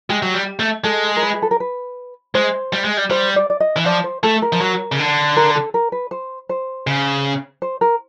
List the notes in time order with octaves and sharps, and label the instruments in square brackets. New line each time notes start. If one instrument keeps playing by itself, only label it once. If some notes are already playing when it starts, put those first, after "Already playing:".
[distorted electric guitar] G#3 [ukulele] G4
[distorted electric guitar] F#3
G3
A3
[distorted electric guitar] G#3 [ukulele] A4
[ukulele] A#4
B4
G#4
A4
A#4
B4
[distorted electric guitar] G#3 [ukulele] C5
[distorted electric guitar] G3
G#3
G3
[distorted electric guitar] G3 [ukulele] C5
[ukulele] D5
D5
D#5
[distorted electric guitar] E3
[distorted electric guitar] F3 [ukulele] D5
[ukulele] C5
[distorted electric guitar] A3 [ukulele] A4
[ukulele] A#4
[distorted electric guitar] F3
F#3
C#3
D3
[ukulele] A#4
A4
A#4
B4
C5
C5
[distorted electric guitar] C#3
[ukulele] C5
A#4